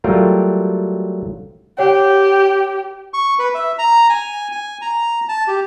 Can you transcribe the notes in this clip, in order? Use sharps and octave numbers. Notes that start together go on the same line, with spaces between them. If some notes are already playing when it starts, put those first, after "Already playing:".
F#3 G3 A3 F4 A#4 G5
G4 C#5 F#5 G5
C#6
B4
E5
A#5
G#5
G#5
A#5
A5
G4